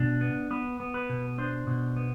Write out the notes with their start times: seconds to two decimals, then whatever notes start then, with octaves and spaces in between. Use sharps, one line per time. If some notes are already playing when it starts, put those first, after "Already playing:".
Already playing: B2 D4
0.21 B3
0.51 B3 B4
0.80 B3
0.94 B4
1.09 B2
1.38 D4 C5
1.67 B2
1.96 B3